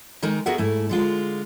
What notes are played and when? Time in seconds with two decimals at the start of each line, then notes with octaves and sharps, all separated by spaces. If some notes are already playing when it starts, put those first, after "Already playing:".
0.22 D#3 G#3 D#4 A#4
0.46 B3 F#4 G#4 A#4 E5 F#5
0.58 G#2 A3 E4
0.89 D3 G#3 F4